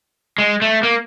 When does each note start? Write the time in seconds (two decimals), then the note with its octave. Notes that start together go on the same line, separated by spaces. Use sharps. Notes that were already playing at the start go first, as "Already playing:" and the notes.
0.38 G#3
0.62 A3
0.83 A#3